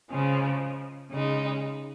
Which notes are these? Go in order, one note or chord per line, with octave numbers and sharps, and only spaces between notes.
C#3 F3 G#3
C#3 G#3 D#4